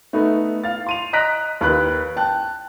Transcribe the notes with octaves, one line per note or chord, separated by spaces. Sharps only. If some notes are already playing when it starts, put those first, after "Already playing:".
A3 B3 D#4 B4
F5 A6
C6 D#7 F7
D#5 A#5 F#6 A#6 B6 D7
D#2 A#4 B4 B5 F#6
G5 A5 F#6